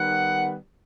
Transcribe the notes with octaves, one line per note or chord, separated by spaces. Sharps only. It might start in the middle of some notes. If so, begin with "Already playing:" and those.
Already playing: D#3 G3 B3 F#5